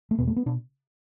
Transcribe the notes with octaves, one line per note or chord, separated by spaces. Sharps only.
A3
E2 B2 B3
A3
B3
B2 D4